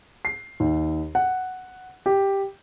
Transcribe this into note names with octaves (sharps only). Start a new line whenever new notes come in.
C7
D#2
F#5
G4